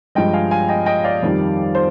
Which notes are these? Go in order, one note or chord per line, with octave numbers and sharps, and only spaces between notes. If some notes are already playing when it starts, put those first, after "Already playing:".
G2 F3 G#3 D#5 G5
F5 G#5
F5 G#5
D#5 G5
D#5 G5
D5 F5
F2 D#3 G3
C5